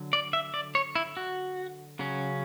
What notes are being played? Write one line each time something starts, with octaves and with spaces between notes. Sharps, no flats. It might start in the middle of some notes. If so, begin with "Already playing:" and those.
Already playing: D3 F#3
D5
E5
D5
C#5
E4
F#4
C#3 F#3 C#4